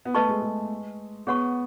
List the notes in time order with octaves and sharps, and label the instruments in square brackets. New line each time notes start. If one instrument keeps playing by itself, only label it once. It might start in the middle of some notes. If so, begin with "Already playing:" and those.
[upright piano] B3
[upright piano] A3 [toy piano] B4 D#5 A5 C#6
[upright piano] G#3
G#3
[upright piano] B3 [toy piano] G#4 C#5 F#5 C#6